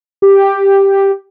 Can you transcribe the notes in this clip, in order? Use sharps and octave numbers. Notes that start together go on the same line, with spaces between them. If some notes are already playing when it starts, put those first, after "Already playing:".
G4